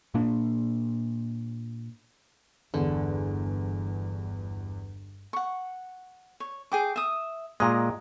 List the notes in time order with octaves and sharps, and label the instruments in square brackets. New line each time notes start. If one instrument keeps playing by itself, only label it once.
[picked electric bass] A#2 A#3 D4
[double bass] G1 [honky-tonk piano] E2 [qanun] D3
[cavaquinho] F#5 C#6
C#5
G#4 G5 D6
E5 D#6
[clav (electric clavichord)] A#2 G#3 [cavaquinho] A#4 D#5